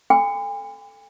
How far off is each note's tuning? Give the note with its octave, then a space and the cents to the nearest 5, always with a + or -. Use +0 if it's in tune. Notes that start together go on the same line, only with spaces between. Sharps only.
A4 +0 G#5 -45 B5 +45